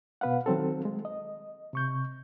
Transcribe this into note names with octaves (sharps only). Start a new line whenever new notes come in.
B2 B3 B4 F5 F#5
D#3 F#3 C4 A4
G#3
D#5
C3 C#6 G6